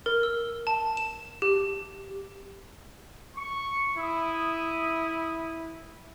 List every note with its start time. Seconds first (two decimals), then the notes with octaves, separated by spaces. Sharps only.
0.06 A#4
0.23 E6
0.67 A5
0.97 E7
1.42 G4
3.35 C#6
3.98 E4 D#6